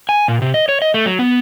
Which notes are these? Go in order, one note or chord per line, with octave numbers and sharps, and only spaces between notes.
G#5
A#2
C3
D#5
C#5
D#5
A3
F#3
B3